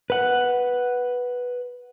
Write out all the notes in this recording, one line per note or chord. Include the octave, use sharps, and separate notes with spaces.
B4 F#5